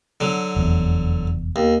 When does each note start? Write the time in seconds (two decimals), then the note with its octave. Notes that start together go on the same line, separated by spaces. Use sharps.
0.20 D3 F#3
0.56 F1 E2
1.56 D#2